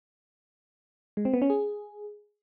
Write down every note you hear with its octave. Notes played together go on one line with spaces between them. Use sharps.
G#3
C4
B3
C#4
G#4